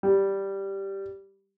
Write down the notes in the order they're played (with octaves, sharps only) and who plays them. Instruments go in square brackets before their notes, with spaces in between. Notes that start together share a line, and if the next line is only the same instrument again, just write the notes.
[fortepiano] G3